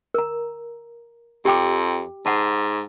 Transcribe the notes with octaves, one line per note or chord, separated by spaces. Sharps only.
A#4 A#5
F2 G4 G5 D6
G#2 F#5 A5